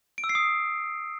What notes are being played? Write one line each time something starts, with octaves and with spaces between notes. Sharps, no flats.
D7
E6
C7
D#6